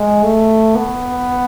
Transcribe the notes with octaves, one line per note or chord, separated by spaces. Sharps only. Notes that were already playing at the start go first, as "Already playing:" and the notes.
Already playing: G#3
A3
B3